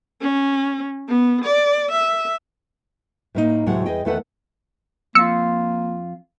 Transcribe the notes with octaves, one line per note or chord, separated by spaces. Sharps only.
C#4
B3
D5
E5
A2 A#3 D#4
D2 A2 C3 F#3 G#3 F#5
E2 G#4 D#5 G5
E2 D#3 A3 A4 B4 F#5
F2 A#3 F4 E6 C#7